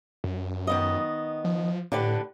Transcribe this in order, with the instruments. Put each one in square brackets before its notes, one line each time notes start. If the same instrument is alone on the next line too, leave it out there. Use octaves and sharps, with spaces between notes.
[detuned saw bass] F#2
[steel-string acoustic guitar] D#3 B3 D#5
[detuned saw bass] F3
[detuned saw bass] A2 [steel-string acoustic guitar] D3 G4 B4